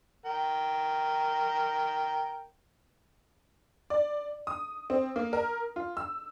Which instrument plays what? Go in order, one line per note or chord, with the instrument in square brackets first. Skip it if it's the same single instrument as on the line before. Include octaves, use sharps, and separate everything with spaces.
[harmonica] A#4 G5
[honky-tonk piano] D5
D#6
C4
A#3
A#4
F4
E6